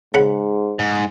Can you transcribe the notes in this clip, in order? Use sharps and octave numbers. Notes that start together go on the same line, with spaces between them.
G#2 C#3 F#5 B5
G#2